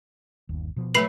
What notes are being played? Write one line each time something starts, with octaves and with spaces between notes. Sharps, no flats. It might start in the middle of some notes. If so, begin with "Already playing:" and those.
G1 D#2
B2 F3
F#3 A3 B4 B5 C7 F#7